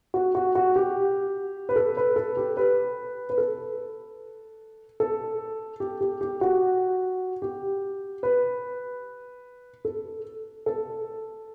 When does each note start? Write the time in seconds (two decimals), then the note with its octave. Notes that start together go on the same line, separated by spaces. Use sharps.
0.14 F#4
0.35 F#4
0.55 F#4
0.76 G4
1.69 B4
1.76 A4
1.97 B4
2.16 A4
2.37 G4
2.57 B4
3.30 B4
3.38 A4
5.00 A4
5.80 G4
6.01 G4
6.21 G4
6.41 F#4
7.42 G4
8.23 B4
9.85 A4
10.66 A4